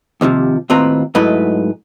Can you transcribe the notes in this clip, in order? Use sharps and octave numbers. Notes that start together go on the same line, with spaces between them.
D#2 C3 D#3 F3
D#2 A2 C4 F4 B4 A#5
G#2 F#3 A3 E4 B4 D#5